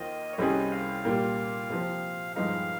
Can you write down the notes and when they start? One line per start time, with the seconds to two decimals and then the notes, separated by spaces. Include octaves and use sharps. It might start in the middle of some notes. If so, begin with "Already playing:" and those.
Already playing: D#2 D#3 A#3 F4 C5 D#5
0.33 C#5
0.38 C2 C3 G3 C#4 G#4 D#5
0.72 F5
1.05 A#2 G3 A#3
1.70 C3 F3 C4
2.36 G2 F3 G#3 D#4 F5